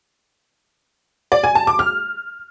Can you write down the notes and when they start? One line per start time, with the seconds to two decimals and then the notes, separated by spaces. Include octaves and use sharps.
1.32 D5
1.44 G#5
1.55 A5
1.67 D6
1.79 F6